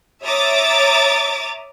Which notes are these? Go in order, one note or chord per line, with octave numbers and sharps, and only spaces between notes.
C#5 E5 A#5 D6 D#6 A6